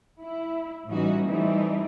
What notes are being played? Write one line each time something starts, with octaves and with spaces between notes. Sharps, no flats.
E4
A2 E3 G3 C#4 D#4 F#4
E3 G3 A3 C4 D#4 E4